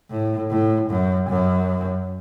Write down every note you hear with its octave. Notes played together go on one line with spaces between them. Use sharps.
A2
A2
F#2
F#2